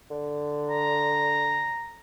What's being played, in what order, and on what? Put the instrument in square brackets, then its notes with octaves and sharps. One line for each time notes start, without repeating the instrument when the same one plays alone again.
[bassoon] D3
[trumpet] A#5